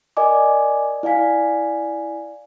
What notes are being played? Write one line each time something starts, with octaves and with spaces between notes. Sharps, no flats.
A#4 D5 D#5 G#5 D6
E4 D5 F5 G#5 B6